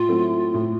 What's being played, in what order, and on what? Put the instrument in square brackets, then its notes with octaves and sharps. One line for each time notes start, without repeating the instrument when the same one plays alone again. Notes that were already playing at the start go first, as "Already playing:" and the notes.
Already playing: [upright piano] A2 [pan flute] F4
[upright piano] F#3 A3 C4 E4
A2